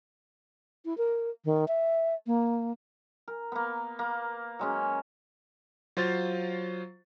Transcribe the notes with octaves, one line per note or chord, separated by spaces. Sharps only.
E4
A#4
D#3
E5
A#3
A#4
A#3 B3
A#3
F#3 G#3 C#4
F#3 F4 C5 F5 A6